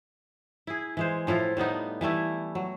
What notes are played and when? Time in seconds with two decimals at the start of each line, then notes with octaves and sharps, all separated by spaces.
0.67 E4 G#4
0.97 E3 G#3 C5
1.27 A2 F3 E4 F4
1.57 A2 G3 B3 D#4
2.01 E3 G3 A3 E4
2.55 F#3